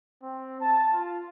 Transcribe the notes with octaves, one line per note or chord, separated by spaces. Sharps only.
C4
A5
F4